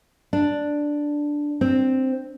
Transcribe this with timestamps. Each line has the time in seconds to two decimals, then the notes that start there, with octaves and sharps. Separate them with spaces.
0.33 D4
1.61 C4